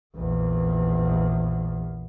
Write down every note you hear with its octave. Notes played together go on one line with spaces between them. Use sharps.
A#1 E2